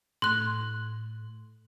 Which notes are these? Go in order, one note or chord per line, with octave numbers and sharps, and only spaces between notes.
A2 C6 F#6